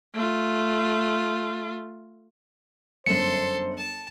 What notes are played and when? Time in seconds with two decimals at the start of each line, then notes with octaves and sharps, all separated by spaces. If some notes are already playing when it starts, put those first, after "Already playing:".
0.15 A3 F4
3.06 G1 F#2 A4 C5 C6 C#7
3.77 A5